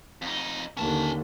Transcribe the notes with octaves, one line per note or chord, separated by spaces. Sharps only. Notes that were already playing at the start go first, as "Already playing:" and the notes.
F2 D#4
D#2 D3 C#4 A5